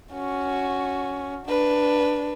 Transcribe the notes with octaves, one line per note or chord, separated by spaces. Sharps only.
C#4 F#4
D4 B4